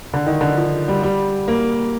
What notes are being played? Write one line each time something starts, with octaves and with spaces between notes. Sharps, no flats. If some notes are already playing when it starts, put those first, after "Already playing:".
D3
D#3
D3
F3
G3
G3
A#3